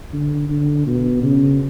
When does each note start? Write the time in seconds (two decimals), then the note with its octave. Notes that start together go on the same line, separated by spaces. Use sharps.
0.13 D3
0.49 D3
0.86 B2
1.23 C#3